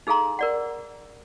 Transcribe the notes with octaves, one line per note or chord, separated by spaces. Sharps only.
D#4 G#4 A4 F5 A#5 C6
A#4 D5 F#5